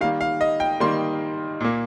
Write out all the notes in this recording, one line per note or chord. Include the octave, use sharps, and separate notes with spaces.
D#3 G3 A#3 F5
F5
D#5
G5
D#3 G3 A#3 C6
A#2 A#3